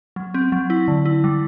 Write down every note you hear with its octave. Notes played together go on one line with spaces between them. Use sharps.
F#3
C4
F#3
E4
D3
E4
G3